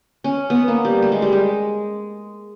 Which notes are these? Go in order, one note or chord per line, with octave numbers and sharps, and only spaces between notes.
C#4
B3
A#3
G3
A3
G#3
G3
G#3